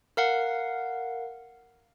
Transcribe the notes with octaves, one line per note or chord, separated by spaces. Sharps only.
A#4 F5 F#5